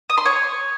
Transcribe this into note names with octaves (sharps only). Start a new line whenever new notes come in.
D#6
C6
C#5